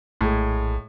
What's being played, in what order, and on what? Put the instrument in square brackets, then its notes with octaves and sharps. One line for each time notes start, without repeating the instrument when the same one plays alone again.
[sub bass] A#1 [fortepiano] A2 G#3